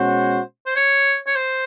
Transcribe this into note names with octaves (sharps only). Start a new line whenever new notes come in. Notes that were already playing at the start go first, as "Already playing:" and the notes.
Already playing: B2 G#3 C#4 F#4 C5
C5
C#5
C#5
C5